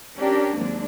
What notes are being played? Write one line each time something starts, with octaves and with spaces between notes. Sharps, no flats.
C#4 D4 G4 A#4
D#2 F#3 G#3 A#3 C4 D4